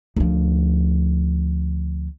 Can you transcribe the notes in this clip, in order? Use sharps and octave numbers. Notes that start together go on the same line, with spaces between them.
D2 F3